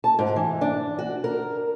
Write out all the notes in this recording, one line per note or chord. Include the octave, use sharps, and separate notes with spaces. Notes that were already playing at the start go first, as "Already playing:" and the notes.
A5
G#2
E3
D4
F#4
A#4